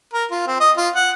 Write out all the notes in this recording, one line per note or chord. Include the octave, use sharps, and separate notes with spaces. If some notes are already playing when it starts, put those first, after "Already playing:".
A#4
F4
C4
D#5
F4
F#5